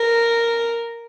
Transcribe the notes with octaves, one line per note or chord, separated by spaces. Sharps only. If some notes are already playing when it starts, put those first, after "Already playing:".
Already playing: A#4